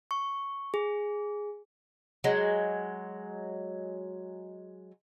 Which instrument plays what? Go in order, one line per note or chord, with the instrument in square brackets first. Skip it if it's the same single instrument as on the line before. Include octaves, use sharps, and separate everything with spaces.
[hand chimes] C#6
G#4
[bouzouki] F#3 G#3